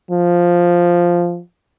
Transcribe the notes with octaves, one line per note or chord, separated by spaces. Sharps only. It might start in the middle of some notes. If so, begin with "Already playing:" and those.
F3